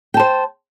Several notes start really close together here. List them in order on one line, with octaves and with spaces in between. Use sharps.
G5 A5 C5